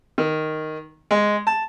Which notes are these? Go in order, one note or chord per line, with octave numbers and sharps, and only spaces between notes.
D#3
G#3
A5